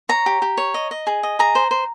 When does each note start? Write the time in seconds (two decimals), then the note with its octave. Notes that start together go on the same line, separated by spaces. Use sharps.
0.09 C#5 A#5
0.26 G4
0.42 G4
0.57 C#5
0.74 D#5
0.91 D#5
1.07 G#4
1.23 D#5
1.39 G#4 A#5
1.55 C5
1.71 C5